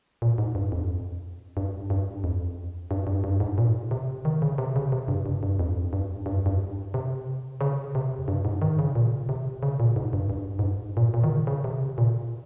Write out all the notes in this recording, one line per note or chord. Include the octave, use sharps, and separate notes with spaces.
A#2
G#2
G2
F2
G2
G2
F2
G2
G2
G2
G#2
A#2
C3
D#3
C#3
C3
C#3
C3
G2
G2
G2
F2
G2
G2
F2
G2
C3
C#3
C3
F2
G2
G#2
D#3
C#3
A#2
C3
C#3
A#2
G#2
G2
G2
G#2
G2
A#2
A#2
D#3
C#3
C#3
C3
A#2